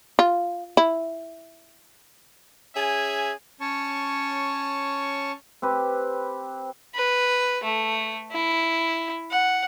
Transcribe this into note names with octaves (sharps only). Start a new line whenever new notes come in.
F4
E4
C#4 G#4 E5 G#5
C#4 C#5 A5 C#6
C4 G4 B4
B4
A3
E4
F#5